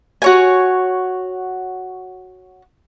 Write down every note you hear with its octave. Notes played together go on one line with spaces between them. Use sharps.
F#4 C#5 G#5